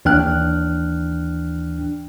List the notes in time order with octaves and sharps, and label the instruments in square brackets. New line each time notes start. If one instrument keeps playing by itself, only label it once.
[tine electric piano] D#2 E3 D4 G5 F6 F#6